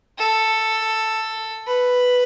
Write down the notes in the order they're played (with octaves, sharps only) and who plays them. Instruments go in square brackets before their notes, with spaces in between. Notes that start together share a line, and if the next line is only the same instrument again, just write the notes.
[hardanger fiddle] A4
B4